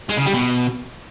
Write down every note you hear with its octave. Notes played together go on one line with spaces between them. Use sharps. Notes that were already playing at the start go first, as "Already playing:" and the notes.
G#3
C#3
G3
B2